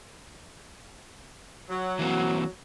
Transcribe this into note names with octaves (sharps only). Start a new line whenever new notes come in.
F#3
E3 A#3 C4